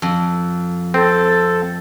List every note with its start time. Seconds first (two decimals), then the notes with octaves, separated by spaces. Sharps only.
0.02 F2
0.94 C4 A4